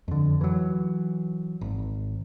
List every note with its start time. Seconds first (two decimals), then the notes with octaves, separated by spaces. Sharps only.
0.08 F2 D3
0.41 E3 F#3
1.61 G#1